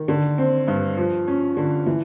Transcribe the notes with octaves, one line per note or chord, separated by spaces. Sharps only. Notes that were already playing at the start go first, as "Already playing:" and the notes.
Already playing: D#3
D3
C4
G2
F3
C#4
D3
E3